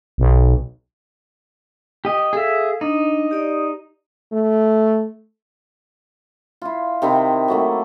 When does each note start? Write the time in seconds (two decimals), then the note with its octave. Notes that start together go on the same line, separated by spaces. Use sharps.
0.18 B1
2.05 G4 D#5
2.33 G#4 A4 E5 F5
2.81 D4 D#4
3.31 G4 D5 D#6
4.32 A3
6.62 E4 F4
7.02 C3 D#3 E4 C6
7.48 F#3 A3 A#3